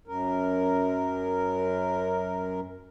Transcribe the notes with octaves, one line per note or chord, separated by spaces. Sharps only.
F#2 A#4